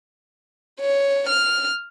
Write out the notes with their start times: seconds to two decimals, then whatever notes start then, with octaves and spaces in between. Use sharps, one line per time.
0.80 C#5
1.29 F6